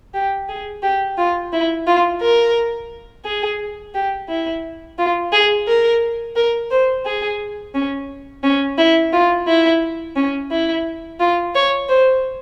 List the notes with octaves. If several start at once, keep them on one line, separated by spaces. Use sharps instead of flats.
G4
G#4
G4
F4
E4
F4
A#4
G#4
G4
E4
F4
G#4
A#4
A#4
C5
G#4
C#4
C#4
E4
F4
E4
C#4
E4
F4
C#5
C5